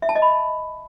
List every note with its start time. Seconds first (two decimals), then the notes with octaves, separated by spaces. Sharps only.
0.02 E5
0.09 A5
0.15 D#5
0.22 B5